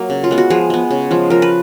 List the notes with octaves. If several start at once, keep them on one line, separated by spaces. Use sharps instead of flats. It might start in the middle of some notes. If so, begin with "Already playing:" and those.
Already playing: F#3 A#3
C#3
F4
G#3 B3
F#4
F3 G#4
G#3 B3
C#3
F3 G#3
F3 A#4
B4